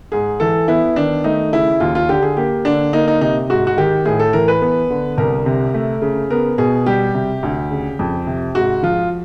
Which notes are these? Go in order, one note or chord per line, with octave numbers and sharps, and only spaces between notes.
G#2 G#4
E3 A4
B3 E4
D#3 D4
A3 D#4
C#3 E4
D#2 F4
F4
D3 G4
G#4
A#3 G4
D3 D4
A#3 D#4
D#4
C3 D#4
G#2 F#4
F#4
D#3 G4
A2 G#4
A4
E3 A#4
B4
B3
D3
C2 A#4
C3
A3
C#3
B3 A#4
B2 G#4
G3 G4
C3
D2
C#3
F2
C3
G#2 F#4
F3 F4